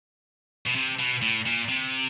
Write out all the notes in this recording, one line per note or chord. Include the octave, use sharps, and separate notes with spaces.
B2
C3
B2
A2
A#2
C3